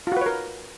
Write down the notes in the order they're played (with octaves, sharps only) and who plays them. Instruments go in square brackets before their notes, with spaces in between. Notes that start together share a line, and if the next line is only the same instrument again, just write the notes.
[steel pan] F4
F#4
B4
C#5
A#4